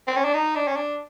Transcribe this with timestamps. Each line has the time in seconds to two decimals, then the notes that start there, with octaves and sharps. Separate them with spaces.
0.07 C4
0.17 C#4
0.25 D4
0.34 D#4
0.56 D4
0.68 C#4
0.77 D4